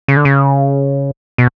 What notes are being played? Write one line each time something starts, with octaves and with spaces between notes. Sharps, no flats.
C#3
D3
C#3
B2